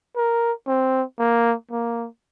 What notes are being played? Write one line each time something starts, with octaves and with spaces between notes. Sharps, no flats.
A#4
C4
A#3
A#3